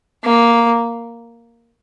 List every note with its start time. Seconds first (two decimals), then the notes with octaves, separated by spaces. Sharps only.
0.24 A#3